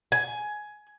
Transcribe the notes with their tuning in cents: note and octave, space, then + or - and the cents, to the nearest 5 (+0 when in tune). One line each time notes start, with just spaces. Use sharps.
G#5 +15